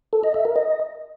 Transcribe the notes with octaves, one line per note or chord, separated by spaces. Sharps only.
A4
D#5
E5
A#4
D#5